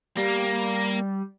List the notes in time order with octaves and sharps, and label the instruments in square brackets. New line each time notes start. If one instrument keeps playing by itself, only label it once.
[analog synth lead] G3 [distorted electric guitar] A#3